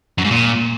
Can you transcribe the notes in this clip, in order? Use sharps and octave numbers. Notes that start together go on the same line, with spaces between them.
F#2
G#2
A#2